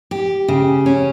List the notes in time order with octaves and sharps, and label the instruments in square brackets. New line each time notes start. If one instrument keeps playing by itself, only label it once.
[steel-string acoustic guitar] G4
C#3
C#4